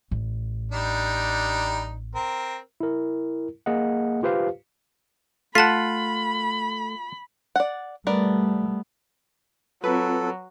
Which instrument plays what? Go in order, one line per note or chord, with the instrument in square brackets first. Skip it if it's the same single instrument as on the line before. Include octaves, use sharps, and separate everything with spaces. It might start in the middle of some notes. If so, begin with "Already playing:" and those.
[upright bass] A1
[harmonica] G3 D4 D#4
C4 A#4
[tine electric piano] E4 A#4
A#3 G#4 D#5 F#5
F4 G4 B4 C5 F5
[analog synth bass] A3 [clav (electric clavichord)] F4 F#5 [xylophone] A5 B6 [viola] B5
[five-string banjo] D5 F#5
[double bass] G3 A3 [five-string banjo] B3 A#4 D5
[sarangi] F#3 [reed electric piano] C4 F4 [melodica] A4 [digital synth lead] B4